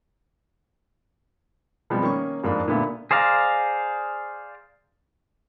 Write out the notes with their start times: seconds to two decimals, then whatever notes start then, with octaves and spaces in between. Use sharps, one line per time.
1.90 B2 F3 G3 G#3 B3 C4
2.02 D#3 A#3 C#4 C#6
2.44 F2 G#2 A#3 D4 B5
2.68 A#2 D3 B3 E5
3.11 G#4 C5 D5 F5 A#5